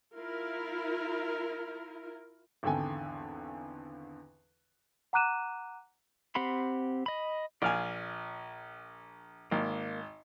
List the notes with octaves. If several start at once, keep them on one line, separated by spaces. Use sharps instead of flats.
E4 F4 A#4
G#1 E2 D3 A4 G5 G#5
F#5 A#5 D6 F#6 D#7 E7
C4 G4 F#5 B5 C6
D#5 B5
A#1 D5 F5 G#5
G#1 A#3